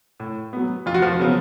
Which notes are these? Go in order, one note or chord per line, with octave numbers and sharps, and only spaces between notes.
A2
F#3 B3
F2 F4
F#4
F3 F4
C#3 F#3 B3